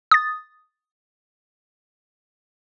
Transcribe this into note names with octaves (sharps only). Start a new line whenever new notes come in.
D#6 A6